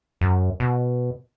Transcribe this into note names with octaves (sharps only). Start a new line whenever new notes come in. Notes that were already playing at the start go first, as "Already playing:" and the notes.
F#2
B2